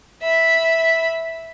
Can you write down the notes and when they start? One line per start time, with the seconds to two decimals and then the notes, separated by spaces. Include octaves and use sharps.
0.22 E5 B5